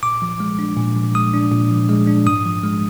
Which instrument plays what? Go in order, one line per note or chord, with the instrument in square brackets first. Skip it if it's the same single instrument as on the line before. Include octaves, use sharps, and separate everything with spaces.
[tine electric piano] A#2 D6
F3
G#3
D4
A#2
F3
G#3 D#6
D4
A#2
F3
G#3
D4
G#2 D#6
F3
G#3